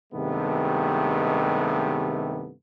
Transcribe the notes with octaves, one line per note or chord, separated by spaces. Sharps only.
G2 C3 D#3 G#3 A3 B3